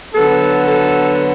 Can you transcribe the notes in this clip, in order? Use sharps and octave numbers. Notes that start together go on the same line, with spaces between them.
D3 F#3 B3 A4
A4